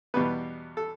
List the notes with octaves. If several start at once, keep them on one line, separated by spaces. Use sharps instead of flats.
E2 B2 G3 B3 B4
A4